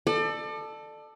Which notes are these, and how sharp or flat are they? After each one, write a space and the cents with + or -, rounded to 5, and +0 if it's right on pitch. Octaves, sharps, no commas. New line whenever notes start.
A4 +0 D5 +35